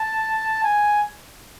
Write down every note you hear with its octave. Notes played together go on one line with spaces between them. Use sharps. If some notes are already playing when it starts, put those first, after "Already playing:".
Already playing: A5
G#5